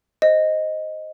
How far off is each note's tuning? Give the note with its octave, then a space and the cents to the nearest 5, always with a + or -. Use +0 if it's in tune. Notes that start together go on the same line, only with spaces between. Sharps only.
C5 +0 D#5 +0